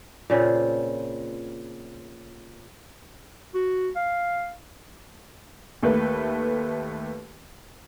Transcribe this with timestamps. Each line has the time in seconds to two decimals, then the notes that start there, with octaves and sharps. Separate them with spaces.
0.30 A#2 C#3 C4 F4
3.55 F#4
3.96 F5
5.83 D#2 A3 B4